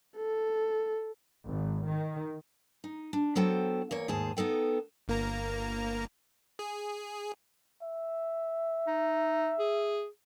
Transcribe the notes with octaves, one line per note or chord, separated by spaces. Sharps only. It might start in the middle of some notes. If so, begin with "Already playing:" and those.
A4
G#1
D#3
D#4
D4
F#3 B3 F#4 A4 C5 G5
E2 A#3 C#5
D#2 G#2 G#4 C5 A5
B3 D#4 A4 G5
G1 A#3 A#5
G#4
E5
D#4
G#4